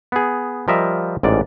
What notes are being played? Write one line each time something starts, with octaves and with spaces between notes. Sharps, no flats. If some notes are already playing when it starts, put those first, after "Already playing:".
B3 G#4
F3 G3 A#4 D#5 E5
A1 G#2 D5